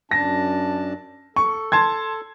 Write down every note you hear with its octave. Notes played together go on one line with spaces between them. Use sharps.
F#2 D4 A5 A#6
A4 C#6
A5 C6 G#6